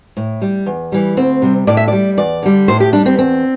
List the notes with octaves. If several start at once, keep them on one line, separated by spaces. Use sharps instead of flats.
A2
G3
E2
E3 G3
D2 C4
C3 G3
A2 D5
E5
G3 D5
E2 D5
D3 G3
A2 C5
G4
G3 D4
C4
E2 C4